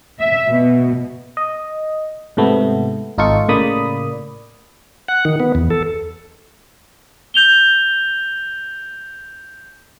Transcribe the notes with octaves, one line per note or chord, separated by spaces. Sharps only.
E5
B2
D#5
G#2 C3 A3 B3
G#1 D#4 F4 A4 C#6
A2 C#3 A#3 D5 B5 D#6
F#5
D#3
B3
E2
A4
G6 F7 G7